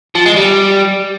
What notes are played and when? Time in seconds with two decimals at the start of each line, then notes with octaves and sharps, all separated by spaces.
0.15 F3
0.26 G#3
0.36 G3